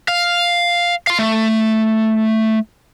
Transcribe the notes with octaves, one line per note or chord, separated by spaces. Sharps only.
F5
F5 C6
A3